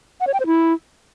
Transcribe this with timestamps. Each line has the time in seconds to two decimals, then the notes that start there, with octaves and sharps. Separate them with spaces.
0.21 F#5
0.27 C#5
0.34 G5
0.40 C5
0.47 E4